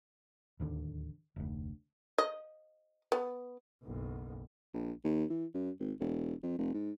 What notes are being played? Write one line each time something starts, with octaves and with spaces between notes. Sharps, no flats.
D1 D#2 D3
F1 D2
D#5
B3
F#1 B1
A#1
D#2
E3
F#2
G#1
E1
F2
F1
G#2